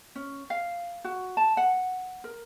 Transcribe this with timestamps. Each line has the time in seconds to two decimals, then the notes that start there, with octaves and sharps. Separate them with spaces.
0.15 C#4
0.50 F5
1.04 F#4
1.37 A5
1.57 F#5
2.24 A#4